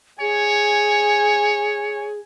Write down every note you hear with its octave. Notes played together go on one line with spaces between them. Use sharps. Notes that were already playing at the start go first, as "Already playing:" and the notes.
G#4 C#5 G#5